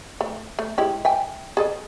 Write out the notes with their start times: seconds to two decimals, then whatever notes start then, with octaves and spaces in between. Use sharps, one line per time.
0.21 A3
0.59 A3
0.78 G#3 E4 G4
1.05 E5 G5 G#5
1.57 G#4 A4 D#5